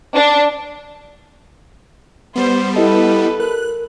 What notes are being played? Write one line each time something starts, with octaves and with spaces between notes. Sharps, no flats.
D4
G3 B3 C5
E4 G4 A4 B4 D#5
A#4 F#6